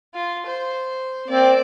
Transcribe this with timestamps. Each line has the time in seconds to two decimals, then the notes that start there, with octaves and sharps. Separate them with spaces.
0.14 F4
0.46 C5
1.28 A#3 C4 D5